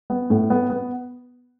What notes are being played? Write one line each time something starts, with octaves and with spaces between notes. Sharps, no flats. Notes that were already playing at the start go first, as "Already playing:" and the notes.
B3
A2
B3
B3